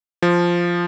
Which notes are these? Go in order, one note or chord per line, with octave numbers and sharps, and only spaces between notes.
F3